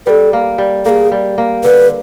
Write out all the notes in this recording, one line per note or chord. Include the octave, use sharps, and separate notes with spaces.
G3 A4 B4
A#3
G3
A#3 G#4 A4
G3
A#3
D3 B4